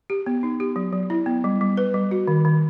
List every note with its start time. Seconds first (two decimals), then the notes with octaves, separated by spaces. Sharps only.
0.10 G4
0.26 B3
0.43 D#4
0.60 G4
0.76 F#3
0.93 F#3
1.10 E4
1.26 B3
1.44 G3
1.61 G3
1.77 B4
1.94 G3
2.11 F#4
2.27 D#3
2.45 D#3